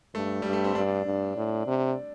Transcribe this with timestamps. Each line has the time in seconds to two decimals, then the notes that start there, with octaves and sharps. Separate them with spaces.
0.15 G2 A3
0.42 G2 G3
0.53 A3
0.64 C4
0.75 G2 D4
1.06 G2
1.36 A2
1.67 C3